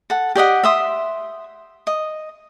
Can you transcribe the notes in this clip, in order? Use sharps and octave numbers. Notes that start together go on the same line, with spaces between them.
A4 F#5
G4 D5 D#5 F#5
E5 C6 D#6
D#5